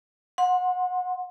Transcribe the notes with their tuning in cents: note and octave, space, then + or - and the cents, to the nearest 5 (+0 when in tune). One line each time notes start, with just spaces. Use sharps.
F#5 -30 C6 +10